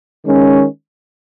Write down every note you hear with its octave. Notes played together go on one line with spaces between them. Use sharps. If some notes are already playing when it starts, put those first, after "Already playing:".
D#3 G#3 C#4